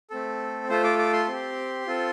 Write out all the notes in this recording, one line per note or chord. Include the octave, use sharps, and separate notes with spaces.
A3 C4 A4
A3 F4 A4 C5
D6
D6
C6
C4 G4
C4 F4 A4